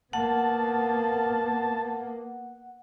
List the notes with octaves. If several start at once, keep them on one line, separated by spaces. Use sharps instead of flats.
A#3 B3 F#5 A5